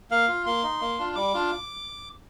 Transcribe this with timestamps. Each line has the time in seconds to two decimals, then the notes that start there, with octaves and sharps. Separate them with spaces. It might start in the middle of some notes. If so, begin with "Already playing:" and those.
0.11 A#3 F5
0.28 F4
0.46 A#3 C6
0.63 D#4
0.81 A#3
0.99 D4 F4
1.15 G3 D6
1.34 D4 F4